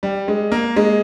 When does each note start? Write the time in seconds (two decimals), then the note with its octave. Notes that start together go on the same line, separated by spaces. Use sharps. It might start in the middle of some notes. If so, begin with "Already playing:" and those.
0.03 G3
0.28 G#3
0.52 A#3
0.76 G#3